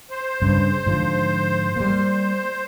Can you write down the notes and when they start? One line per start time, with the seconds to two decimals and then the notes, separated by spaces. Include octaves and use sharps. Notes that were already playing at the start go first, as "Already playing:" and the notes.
0.10 C5
0.42 G2 C#3
0.86 G#2 D3 F3
1.76 G3 A#3